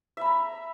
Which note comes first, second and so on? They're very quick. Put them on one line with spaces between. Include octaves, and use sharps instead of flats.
E5 B5 A#5